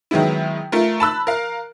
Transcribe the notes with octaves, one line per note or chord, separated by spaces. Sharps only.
D#3 F#3 G#3 B3 E4
A3 F4 A#4
A5 B5 E6 F#6
A#4 F5